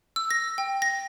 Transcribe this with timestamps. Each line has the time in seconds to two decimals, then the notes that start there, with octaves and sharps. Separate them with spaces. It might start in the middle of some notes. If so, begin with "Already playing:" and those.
0.16 E6
0.31 A#6
0.58 G5
0.82 A#6